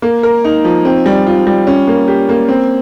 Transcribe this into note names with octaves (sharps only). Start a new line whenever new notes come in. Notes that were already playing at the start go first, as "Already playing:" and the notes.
A#3
A#4
D#4
F3
C4
G3
F4
G3
C#4
A#3
G4
A#3
C4